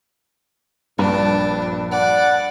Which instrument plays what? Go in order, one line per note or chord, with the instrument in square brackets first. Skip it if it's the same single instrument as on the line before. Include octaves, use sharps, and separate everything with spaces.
[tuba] A#1 [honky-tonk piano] G2 [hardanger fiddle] D4
[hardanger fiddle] D5 [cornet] F#5